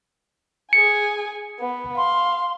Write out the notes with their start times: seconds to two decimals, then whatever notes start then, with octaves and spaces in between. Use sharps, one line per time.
0.73 G#4 G#5 C#7
1.60 B3
1.97 F5 C6